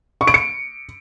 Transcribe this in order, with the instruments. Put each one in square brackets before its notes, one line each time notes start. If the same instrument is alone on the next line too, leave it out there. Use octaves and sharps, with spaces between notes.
[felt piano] C#6
D7
C#7